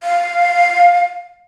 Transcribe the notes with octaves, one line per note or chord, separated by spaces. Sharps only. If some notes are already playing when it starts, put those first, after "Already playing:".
F5